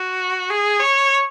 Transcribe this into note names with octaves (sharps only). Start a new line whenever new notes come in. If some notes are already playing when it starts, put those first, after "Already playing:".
Already playing: F#4
G#4
C#5